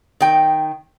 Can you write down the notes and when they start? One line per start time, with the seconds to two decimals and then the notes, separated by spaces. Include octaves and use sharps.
0.20 D#3 G5